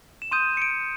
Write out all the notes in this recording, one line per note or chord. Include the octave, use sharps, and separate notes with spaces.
E7
C6 D#6 G6 D#7
C#7
D7